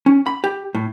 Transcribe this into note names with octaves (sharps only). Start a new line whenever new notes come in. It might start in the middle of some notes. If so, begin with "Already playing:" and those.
C#4
B5
G4
A2